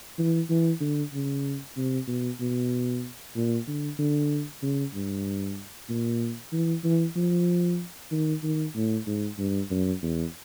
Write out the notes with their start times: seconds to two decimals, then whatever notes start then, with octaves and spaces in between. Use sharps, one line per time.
0.18 E3
0.49 E3
0.81 D3
1.13 C#3
1.77 C3
2.08 B2
2.40 B2
3.36 A#2
3.67 D3
3.99 D3
4.62 C#3
4.94 G2
5.89 A#2
6.52 E3
6.84 E3
7.16 F3
8.11 D#3
8.43 D#3
8.75 A2
9.07 G#2
9.38 G2
9.70 F#2
10.02 E2